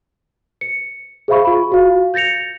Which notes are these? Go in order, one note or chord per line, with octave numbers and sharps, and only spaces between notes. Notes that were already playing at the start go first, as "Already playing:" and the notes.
C#7
G#4 C5 E5 F5 B5 C#6
F4 B5
F#4 F5
G6 A6 A#6 C#7 F7